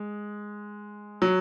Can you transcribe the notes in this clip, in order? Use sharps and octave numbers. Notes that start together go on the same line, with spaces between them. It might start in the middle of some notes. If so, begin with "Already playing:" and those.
Already playing: G#3
F#3